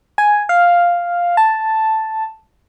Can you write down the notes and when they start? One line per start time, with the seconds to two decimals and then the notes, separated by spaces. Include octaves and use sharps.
0.18 G#5
0.49 F5
1.37 A5